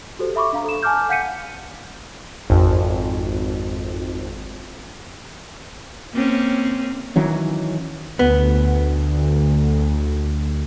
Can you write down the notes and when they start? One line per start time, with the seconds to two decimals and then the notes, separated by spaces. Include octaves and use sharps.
0.19 F#4 G4 A4 C5
0.35 A4 E5 B5 C#6 D6
0.53 D4 F5 A#5
0.65 A4 E7
0.83 G#5 A5 D6 F6 G6
1.09 F5 F#5 G6 B6 C#7 D#7
2.50 G#1 F2
6.12 A#3 C4 C#4
7.16 D#3 E3 F#3 C#4
8.19 D2 B3